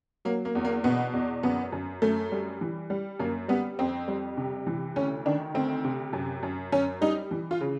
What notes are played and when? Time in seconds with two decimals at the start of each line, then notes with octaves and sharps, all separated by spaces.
0.25 F#3 A#3
0.45 A#3
0.55 E2
0.65 A#3
0.84 B2 B3
1.13 E2
1.43 F#2 B3
1.72 F#2
2.02 F#2 A3
2.32 G3
2.61 E3
2.90 G3
3.20 F#2 A#3
3.48 G3 B3
3.79 F2 C4
4.08 G3
4.37 C3
4.67 E3
4.96 D2 C#4
5.25 D#3 D4
5.54 D2 C4
5.84 C3
6.13 F#2
6.43 F#2
6.72 F#2 C#4
7.01 G3 D#4
7.31 E3
7.51 F4
7.61 C#3